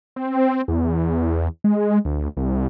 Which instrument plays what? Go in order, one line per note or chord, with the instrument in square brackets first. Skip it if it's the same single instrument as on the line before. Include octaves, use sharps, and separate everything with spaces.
[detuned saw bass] C4
E2
G#3
D2
C2